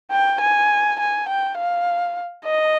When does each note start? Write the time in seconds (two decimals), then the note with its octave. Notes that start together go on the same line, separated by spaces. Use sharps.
0.11 G5
0.41 G#5
1.00 G#5
1.28 G5
1.58 F5
2.45 D#5